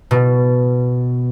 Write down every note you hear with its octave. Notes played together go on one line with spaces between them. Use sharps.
B2